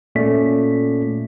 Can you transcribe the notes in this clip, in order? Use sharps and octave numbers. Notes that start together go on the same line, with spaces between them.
A#2 A3 A#3 C#4 D5 B6